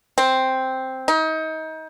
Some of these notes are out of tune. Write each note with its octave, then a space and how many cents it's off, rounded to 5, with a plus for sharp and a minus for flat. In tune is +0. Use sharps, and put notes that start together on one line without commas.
C4 +0
D#4 +30